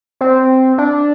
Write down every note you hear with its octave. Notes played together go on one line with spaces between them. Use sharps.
C4
D4